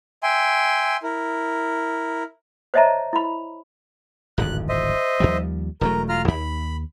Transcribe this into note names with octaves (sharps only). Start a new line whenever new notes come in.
E5 G5 G#5 C6
E4 A#4
C5 C#5 D#5 E5 A5 A#5
E4 B5
D1 G#1 F2 F#6
C5 D#5 E5
D#2 F3 G3
E1 F#3 A3 A#4
F4 A#5 F6
D#2 B5